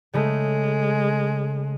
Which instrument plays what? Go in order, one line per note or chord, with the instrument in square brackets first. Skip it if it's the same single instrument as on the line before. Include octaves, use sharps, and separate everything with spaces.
[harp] C#3 A3 [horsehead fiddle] G#3